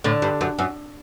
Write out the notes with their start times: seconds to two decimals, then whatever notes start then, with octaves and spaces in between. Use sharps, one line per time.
0.04 A2 D3
0.22 G2
0.41 F#2
0.59 F#2